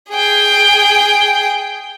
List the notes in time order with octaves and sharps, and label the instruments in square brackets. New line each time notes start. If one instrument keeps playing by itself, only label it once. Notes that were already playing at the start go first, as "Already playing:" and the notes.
[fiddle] G#4 G5